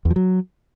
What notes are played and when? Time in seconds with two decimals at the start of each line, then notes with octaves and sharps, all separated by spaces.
0.05 E2
0.11 F3
0.16 F#3